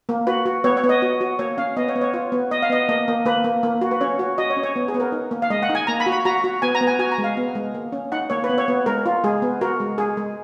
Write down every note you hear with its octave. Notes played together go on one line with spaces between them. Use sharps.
A#3
F#4 B4
F#4
B3 C#5
C#5
B3
D#5
F#4
F#4
A#3 C#5
C#4 F5
B3 D#5
C#5
B3
C#5
F4 C#5
B3
B3 D#5
F5
B3 D#5
A#3 D#5
A#3
A#3 B4
A#3
A#3
F#4
B4
C#4 C#5
F#4
F#4 D#5
C#5
C#4
C#5
B3
G#4
B3
A#4
D#4
A#3
F5
G#3 D#5
F#5
D#4
G#5
A#3 A#5
B5
F#4
B5
F#4 A#5
F#4
B3 G#5
A#5
B3
G#5
F#4 G#5
A#5
G#3
F5
B3
G#3
A#3
C#4
D#4 F#5
A#3 C#5
B4
B3
C#5
B3
G#3 A#4
F4
G#3 G#4
B3
F#4 A#4
G#3
G#3 G#4
G#3